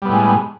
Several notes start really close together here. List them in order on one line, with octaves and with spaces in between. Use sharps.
G3 B3 A2 G#3